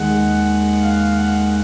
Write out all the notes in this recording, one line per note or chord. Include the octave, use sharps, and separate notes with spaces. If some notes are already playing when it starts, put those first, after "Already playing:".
Already playing: D#2 D#3 G#3 F#5
F5
F#5